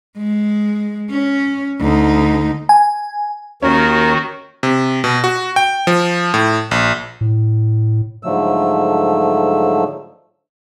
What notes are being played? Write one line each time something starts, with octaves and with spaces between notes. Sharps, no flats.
G#3
C#4
D2 D#4
G#5
D#2 D#3 C#4 F#4 A#4
C3
B2
F#4
G5
F3
A2
A#1
A2
G#2 D3 F3 F#3 A3 E6